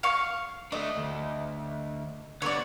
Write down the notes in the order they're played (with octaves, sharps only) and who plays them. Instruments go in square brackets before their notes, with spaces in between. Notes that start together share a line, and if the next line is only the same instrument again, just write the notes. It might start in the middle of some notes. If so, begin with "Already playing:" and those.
[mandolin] F5 C#6
[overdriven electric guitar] A3 D4 [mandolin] D#5
[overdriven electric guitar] D2
[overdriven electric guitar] D3 B3 [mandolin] C#5 D5